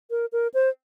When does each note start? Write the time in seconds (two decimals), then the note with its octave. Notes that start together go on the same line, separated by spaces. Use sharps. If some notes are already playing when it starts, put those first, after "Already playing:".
0.11 A#4
0.32 A#4
0.54 C5